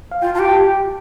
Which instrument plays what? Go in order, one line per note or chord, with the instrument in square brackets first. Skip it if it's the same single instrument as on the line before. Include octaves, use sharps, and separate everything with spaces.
[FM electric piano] F5
[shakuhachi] F4 [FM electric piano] G5
[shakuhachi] F4 G4 [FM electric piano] A5
[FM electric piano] G5